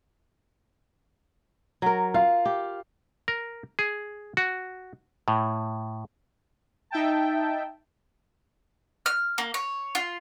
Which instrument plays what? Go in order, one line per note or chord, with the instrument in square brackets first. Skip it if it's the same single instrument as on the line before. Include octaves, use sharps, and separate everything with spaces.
[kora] F#3 A#4
[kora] F4 [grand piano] F5
[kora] G4
[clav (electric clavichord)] A#4
G#4
F#4
A2
[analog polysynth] D#4 E5 G5 A5
[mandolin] F6
A#3
C#5
F4